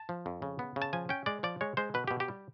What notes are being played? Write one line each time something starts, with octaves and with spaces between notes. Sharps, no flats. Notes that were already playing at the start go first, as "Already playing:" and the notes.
Already playing: A5
F3
F2
C#3
B3
C#3
A5
F3 G#5
C#4 G5
G#3 D5
F3 D5
G#3 C#5
G#3 C5
B2 B4
B2 G4
G4
G3